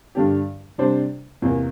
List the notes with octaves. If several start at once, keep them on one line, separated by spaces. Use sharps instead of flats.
G2 D3 G3 D4 G4
C3 G3 D4 G4 C5
E2 C3 E3 A#3